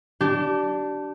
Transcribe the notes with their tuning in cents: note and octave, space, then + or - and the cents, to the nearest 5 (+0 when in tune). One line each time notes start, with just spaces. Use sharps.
D4 +0 G4 -30